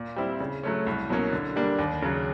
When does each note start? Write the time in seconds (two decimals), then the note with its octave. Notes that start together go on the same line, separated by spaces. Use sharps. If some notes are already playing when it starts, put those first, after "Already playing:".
Already playing: A#2
0.16 G3 C4 E4
0.40 C#3
0.63 F#3 A3 C#4
0.87 C2
1.09 B2 F#3 A#3 C#4
1.32 D3
1.56 G3 A#3 D4
1.79 D#2
2.02 C#3 F#3